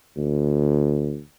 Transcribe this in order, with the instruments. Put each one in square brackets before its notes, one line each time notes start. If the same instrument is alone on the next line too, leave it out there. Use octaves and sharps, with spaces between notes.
[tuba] D2